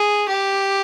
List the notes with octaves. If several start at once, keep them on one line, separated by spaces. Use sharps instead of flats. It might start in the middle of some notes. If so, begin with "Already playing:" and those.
Already playing: G#4
G4